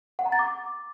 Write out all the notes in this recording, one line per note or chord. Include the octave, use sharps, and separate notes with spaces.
F#5
A#5
A6
D6